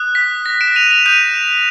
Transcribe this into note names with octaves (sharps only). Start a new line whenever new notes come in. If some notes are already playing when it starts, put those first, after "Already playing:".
Already playing: D#6 F#6
B6
A#6
D7 E7
D#7 F7
D#7 F7
D#6 G6 D#7 F7